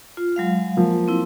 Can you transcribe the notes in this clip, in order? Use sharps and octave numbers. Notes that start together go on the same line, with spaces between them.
F4
F#3 G#3 F5
F3 A#3
C4 E4